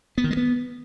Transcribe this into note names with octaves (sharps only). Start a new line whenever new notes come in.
B3
D#3
G#3
B3